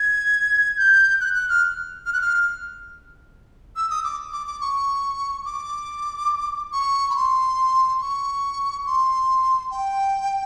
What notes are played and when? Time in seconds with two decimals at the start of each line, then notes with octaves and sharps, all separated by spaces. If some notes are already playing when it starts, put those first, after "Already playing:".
Already playing: G#6
0.77 G6
1.21 F#6
1.34 F#6
1.49 F6
2.06 F6
2.13 F#6
2.21 F6
3.76 E6
3.90 D#6
4.04 D6
4.32 D6
4.47 D6
4.61 C#6
5.45 D6
6.73 C#6
7.10 B5
7.16 C6
8.01 C#6
8.86 C6
9.71 G5